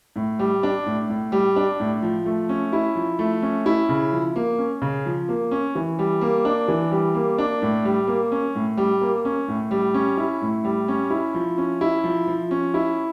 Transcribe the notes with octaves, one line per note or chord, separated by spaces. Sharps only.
A2
G3
D4
A2
A2
G3
D4
A2
F3
A3
C#4
E4
F3
A3
C#4
E4
C#3
F3
A#3
C#4
C#3
F3
A#3
C#4
E3
G3
A#3
D4
E3
G3
A#3
D4
A2
G3
A#3
C#4
A2
G3
A#3
C#4
A2
G3
C#4
E4
A2
G3
C#4
E4
F3
C#4
E4
F3
F3
C#4
E4